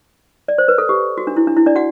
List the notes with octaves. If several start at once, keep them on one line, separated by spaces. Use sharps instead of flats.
D5
C5
B4
A4
G4
F#4
D4
E4
D4
E4
D4 D5
F#4 F#5